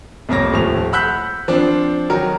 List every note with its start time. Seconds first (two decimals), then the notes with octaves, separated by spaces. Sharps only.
0.29 C2 F2 A#3 C#5 A#6
0.51 D#1 A2 F3 F7
0.92 F#5 B5 E6 F#6 G6 B6
1.48 F3 C4 D4
2.10 D#3 F#3 A#4